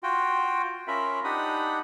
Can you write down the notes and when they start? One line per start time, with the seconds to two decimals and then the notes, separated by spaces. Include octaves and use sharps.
0.03 F4 F#4 G5
0.88 C#4 F4 A#4 E5 B5
1.24 D4 D#4 G4 F#5 B5 D#6